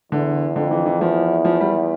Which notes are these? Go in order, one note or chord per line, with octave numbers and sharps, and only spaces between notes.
E2 D3
F2 D3
E3
E3
E2 F3
F3
G3